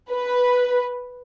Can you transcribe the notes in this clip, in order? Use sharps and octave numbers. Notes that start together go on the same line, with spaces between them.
B4